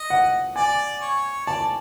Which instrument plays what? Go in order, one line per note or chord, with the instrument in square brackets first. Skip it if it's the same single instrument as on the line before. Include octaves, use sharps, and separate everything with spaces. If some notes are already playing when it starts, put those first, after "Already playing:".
Already playing: [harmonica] D#5
[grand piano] F#5
[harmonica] D5 [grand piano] G#5
[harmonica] C#5
[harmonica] D5 [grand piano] A5